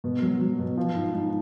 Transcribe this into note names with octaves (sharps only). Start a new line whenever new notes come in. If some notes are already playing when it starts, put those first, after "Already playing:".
B2
F#3
F#3
B2
F3
G#2
G#2